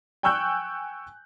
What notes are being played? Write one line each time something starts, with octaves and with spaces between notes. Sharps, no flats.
G5 G#5 C#6 E6 F#6 G6